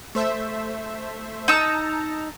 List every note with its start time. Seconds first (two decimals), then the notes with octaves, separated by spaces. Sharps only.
0.15 A3 C5 E5
1.48 D#4 A5 A#5 E6